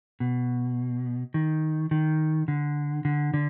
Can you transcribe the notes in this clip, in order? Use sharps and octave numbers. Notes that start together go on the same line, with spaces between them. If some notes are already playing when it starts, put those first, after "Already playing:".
B2
D#3
D#3
D3
D3
D3